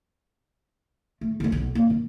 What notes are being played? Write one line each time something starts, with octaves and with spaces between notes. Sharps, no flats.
A3
D#2 D#3
B1
A#3 C4
D#3